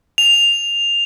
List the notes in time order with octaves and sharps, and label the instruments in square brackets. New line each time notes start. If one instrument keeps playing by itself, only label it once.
[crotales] F7